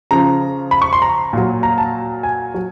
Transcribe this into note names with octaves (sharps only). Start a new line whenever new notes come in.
C#3 F3 A#5
B5
C#6
C6
A#5
A#2 F#3
A#5
A5
G#5
F#3